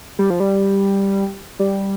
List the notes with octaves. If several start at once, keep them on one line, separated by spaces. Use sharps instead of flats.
G3
F3
G3
G3